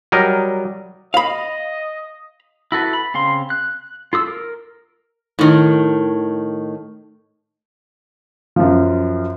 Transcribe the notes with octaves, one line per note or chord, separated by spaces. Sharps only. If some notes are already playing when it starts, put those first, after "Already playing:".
F#3 G3 A#4 D#5
D#5 F5 B5
E4 F#4 A4 B4
B5
C#3 C4 F5 C6
F#6
F4 A4 D#6 E6
A#4
A2 D#3
F#2 F3